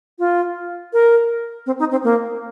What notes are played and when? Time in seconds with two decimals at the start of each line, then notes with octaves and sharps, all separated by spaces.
0.19 F4
0.93 A#4
1.66 C4
1.79 D#4
1.91 C4
2.04 A#3